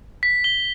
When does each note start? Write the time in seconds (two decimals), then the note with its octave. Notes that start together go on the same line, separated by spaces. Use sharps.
0.23 B6
0.44 G7